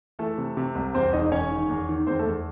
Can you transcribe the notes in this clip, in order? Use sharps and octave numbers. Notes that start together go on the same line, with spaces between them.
E3 A3 A4
C3
C3
C2
E2 C4 C5
E1 D#4 D#5
D#5
E1 C#4 C#5
D#3
E2
D#3
E2 C4 C5
A3 A4
E2